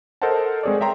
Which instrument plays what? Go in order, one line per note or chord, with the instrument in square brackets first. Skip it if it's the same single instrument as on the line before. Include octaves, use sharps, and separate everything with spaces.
[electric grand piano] A4 A#4 C5 D#5 F#5 A5
G#3 C4 G#4 C#5 D5
E5 G5 A#5 C6